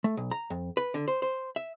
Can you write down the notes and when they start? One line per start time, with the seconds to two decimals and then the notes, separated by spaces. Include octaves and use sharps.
0.04 A3
0.17 B1
0.31 A#5
0.50 F2
0.77 B4
0.94 D3
1.08 C5
1.22 C5
1.56 E5